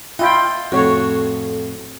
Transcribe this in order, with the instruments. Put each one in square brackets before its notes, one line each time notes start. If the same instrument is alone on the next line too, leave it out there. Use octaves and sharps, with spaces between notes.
[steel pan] E4 F4 G5 [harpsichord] D#5
[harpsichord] F2 A2 [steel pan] F#4 C#5